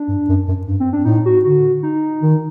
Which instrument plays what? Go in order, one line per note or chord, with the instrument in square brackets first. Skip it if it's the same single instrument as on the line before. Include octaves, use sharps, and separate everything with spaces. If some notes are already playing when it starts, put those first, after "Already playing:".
Already playing: [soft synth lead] D4
[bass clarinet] G2
F#2
F#2
G2
[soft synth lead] C4
D4
[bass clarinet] A2 [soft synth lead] D#4
[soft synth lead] F#4
[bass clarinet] D3 [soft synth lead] F#4
[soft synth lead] D#4
[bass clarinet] D#3